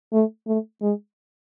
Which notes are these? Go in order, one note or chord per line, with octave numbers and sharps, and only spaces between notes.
A3
A3
G#3